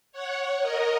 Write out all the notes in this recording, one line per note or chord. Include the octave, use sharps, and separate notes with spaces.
C#5 F#5
A#4 D#5